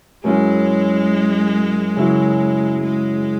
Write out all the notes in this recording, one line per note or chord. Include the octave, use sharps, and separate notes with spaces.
F#2 F#3 G#3 C#4 E4
C#3 F#3 E4
G#3